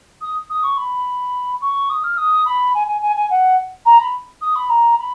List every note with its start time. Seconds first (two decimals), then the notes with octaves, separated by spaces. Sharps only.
0.21 D#6
0.50 D#6
0.63 C#6
0.77 B5
1.61 C#6
1.90 D#6
2.04 F6
2.17 D#6
2.46 B5
2.74 G#5
2.87 G#5
3.02 G#5
3.16 G#5
3.30 F#5
3.86 A#5
4.01 B5
4.41 D#6
4.56 B5
4.69 A#5
4.99 B5